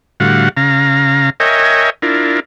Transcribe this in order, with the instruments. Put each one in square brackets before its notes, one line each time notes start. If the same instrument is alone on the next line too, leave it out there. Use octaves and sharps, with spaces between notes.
[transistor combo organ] A2 D3 G3 F#4 F5 F#5
C#3 F5 A#5
A#4 C#5 D#5 E5 G5 G#5
D4 E4 F4 A#4